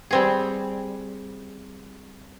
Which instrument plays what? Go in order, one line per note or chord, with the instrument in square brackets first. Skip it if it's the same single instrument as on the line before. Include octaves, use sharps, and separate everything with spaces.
[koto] G3 C4 G#4